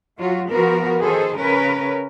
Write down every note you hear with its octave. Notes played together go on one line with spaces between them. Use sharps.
F#3 F4 F#4
F3 B3 F#4 A#4
D#3 G#4 A4 C5
C#3 C#4 A#4 B4